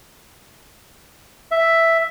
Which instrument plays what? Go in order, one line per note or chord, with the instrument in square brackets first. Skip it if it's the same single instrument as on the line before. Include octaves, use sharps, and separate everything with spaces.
[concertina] E5